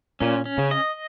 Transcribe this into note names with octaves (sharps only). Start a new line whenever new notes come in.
A#2 C#4
C#4
C#3
D#5